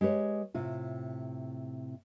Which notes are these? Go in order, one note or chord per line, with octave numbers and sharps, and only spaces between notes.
G#3 G4 B4 C#5
A2 C3 F4